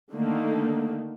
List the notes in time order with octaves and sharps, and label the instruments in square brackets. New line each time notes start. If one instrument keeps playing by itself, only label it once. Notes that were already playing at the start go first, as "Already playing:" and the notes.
[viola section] D3 D#3 A3 A#3